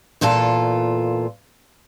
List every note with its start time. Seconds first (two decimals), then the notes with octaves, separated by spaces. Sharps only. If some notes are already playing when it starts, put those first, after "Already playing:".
0.21 E2 A#2 F4 A4 A5